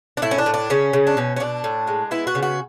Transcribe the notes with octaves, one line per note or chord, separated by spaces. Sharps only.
D4
A2 E4
C#4
D4
A2
D4
C#3 C#4
C#3
D4
B2 C#4
C#4
B2 D4
A2
G#3
B3 E4
F#4
C#3
F#4